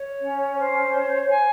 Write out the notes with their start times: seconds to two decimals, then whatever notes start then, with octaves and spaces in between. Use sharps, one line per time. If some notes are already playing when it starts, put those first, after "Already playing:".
Already playing: C#5
0.20 C#4
0.57 C5
0.93 C#5
1.29 G#5